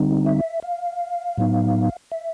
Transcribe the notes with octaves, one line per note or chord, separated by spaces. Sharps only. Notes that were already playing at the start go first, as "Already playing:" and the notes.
Already playing: D3 G3 C4 D#4
E5
F5
A2 F#3 B3 D#4
E5